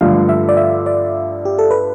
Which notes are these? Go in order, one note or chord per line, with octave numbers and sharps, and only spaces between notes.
G2 D3 F3 A3 F5
E5
D5
E5
D5
G4
A4
B4